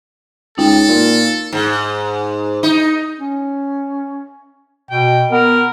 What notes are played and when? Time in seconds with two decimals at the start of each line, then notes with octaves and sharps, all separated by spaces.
0.58 C#2 D#4 A4 G5
0.89 A#2
1.53 G#2
2.63 D#4
3.18 C#4
4.90 B2 G5
5.31 B3 A#4